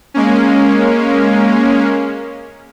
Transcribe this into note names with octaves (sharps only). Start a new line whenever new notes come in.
G#3 A#3 C#4